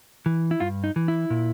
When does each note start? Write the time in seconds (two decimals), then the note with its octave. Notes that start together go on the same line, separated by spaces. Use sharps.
0.26 E3
0.51 E4
0.60 G2 F4
0.84 D#4
0.96 E3
1.08 E4
1.30 A#2